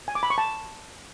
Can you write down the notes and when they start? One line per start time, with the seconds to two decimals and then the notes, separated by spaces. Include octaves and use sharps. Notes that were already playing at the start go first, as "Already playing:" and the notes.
0.08 G#5
0.15 D6
0.23 B5
0.30 C#6
0.38 A5